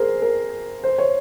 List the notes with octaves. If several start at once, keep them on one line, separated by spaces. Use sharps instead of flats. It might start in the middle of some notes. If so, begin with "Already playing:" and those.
Already playing: G#4 A#4 C5
A#4
C5
C#5